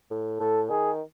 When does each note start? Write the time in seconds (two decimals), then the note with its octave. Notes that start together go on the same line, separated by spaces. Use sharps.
0.10 A2
0.40 A2 A4
0.70 D#3 G#4